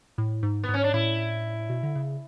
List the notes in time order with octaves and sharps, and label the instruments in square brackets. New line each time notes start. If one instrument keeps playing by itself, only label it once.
[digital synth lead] A2
G#2
[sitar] B3
[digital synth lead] G#2
[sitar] C#4
D4
[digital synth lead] A2 [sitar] E4
[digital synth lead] B2
D3
C#3